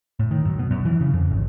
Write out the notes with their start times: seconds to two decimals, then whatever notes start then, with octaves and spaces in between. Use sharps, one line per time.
0.19 A2
0.31 D#3
0.45 F#2
0.59 B2
0.71 F#2
0.85 E3
1.01 C#3
1.13 F2
1.31 G#1